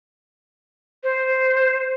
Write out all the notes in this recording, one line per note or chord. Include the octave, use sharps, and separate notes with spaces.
C5